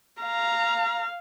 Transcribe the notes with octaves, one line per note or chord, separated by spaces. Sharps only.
F5 A#5